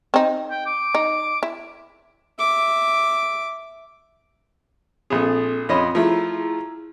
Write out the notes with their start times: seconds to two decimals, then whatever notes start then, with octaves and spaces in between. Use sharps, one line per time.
0.14 C4 D#4
0.51 G5
0.66 D6
0.95 D#4
1.43 E4
2.38 E5 D6
5.10 A#1 C4 G#4 A4
5.69 F2 C4 C#4 D#5 B5
5.95 F3 A3 E4 G#4 A#5